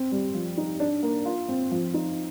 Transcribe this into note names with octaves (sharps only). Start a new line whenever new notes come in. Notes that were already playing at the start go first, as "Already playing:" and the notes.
Already playing: C4
G3
F3
D#4
D4
A#3
F4
C4
F3
D#4